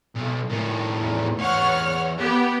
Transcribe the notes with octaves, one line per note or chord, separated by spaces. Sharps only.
B1
A2 D#3
E2
E2 C#5 F#5 C6 F6
B3 G4